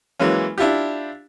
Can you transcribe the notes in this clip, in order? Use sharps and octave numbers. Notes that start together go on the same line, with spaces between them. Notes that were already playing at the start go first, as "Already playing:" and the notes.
E3 F#3 G#3 A#3 C#4
D4 E4 F4 G4